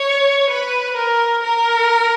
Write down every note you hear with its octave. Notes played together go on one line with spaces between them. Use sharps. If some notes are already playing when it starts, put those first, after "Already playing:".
Already playing: C#5
B4
A#4
A#4